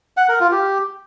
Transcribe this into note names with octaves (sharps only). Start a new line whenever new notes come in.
F#5
A#4
F4
G4